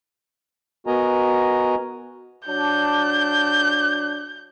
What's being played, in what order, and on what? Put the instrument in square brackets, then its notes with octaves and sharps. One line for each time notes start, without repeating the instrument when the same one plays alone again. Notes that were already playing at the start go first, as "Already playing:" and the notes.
[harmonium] B3 F#4 A#4 D#5 G#5 A#5
[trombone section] F#3 D4 [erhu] G6